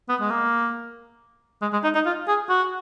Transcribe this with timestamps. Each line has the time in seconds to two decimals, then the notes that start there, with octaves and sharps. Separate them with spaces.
0.09 B3
0.21 G#3
0.31 A#3
1.62 G#3
1.73 G#3
1.84 D#4
1.95 D#4
2.06 F4
2.28 G#4
2.49 F#4